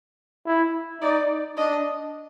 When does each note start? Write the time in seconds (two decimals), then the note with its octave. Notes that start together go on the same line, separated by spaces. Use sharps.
0.46 E4
1.01 D#4 D5
1.57 D4 D#5